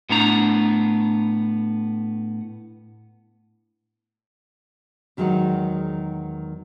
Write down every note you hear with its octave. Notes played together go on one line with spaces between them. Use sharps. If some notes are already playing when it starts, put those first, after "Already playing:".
A2 B3 D4 A#5
E2 D#3 F#3 G#3 D#4 F#5